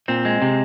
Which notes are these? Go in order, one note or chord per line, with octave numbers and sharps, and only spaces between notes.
A#2 C4
G#3
C3